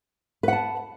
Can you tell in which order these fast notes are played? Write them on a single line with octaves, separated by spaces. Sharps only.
B4 F#5 A5